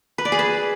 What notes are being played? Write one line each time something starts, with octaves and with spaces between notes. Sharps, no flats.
B4
D5
G#4
B4